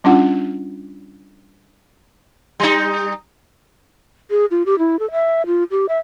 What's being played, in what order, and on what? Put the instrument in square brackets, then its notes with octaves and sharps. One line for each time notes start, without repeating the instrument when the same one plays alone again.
[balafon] G3 C#4 D4 F4 F#5
[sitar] G3 D#4
[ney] G#4
F4
G4
E4
A4
E5
F4
G4
E5